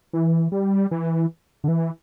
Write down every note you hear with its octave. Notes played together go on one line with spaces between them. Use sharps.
E3
G3
E3
D3
E3